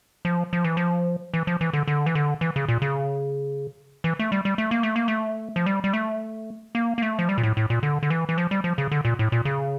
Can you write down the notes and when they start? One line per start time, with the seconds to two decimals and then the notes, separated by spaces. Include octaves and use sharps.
0.25 F3
0.53 F3
0.64 E3
0.77 F3
1.34 E3
1.47 F3
1.61 E3
1.73 D3
1.88 D3
2.06 E3
2.15 D3
2.41 E3
2.56 C#3
2.68 A#2
2.82 C#3
4.04 E3
4.19 A3
4.32 G3
4.45 G3
4.58 A3
4.71 A#3
4.83 A3
4.96 A#3
5.08 A3
5.56 F3
5.66 G3
5.84 G3
5.93 A3
6.75 A#3
6.98 A#3
7.02 A3
7.19 F3
7.29 G3
7.38 A#2
7.43 A2
7.57 A2
7.70 A#2
7.83 D3
8.03 D3
8.10 E3
8.29 E3
8.38 F3
8.51 G3
8.64 F3
8.78 C#3
8.91 D3
9.05 A#2
9.19 A2
9.32 A#2
9.45 C#3